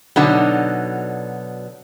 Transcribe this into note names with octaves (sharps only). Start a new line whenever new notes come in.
B2 D3 F#3 D#4